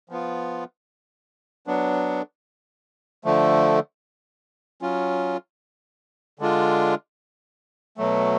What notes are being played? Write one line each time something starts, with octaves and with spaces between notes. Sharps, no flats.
F3 B3 F4
F#3 B3 D4
D3 F3 A3
F#3 C#4 F4
D3 G#3 D4 F4
B2 F#3 A3